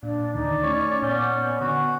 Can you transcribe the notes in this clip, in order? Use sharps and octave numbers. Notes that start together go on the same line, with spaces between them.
A#2 D4 D5
D#2 D3 D#3 D#4
A3 C#4 D#4 C#5
A#2 B3 C#4 G6
D3 F#4